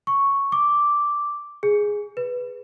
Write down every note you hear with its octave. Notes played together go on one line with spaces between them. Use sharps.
C#6
D6
G#4
B4